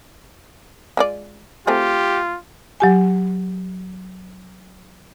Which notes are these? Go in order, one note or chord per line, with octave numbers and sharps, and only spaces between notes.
G#3 F4 D5
A3 C4 F4 G4 G#4
F#3 G4 G#5